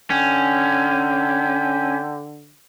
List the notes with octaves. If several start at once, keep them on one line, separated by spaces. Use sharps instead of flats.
D3 C#4 G5